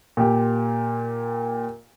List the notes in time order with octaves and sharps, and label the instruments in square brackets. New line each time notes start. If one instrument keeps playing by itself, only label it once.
[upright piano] A#2 G4